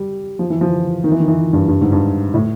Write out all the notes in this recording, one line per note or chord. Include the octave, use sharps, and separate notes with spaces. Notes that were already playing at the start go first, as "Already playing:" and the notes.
Already playing: G3
F3
E3
F3
D#3
E3
D#3
E3
G2
G2
G#2
G2
A2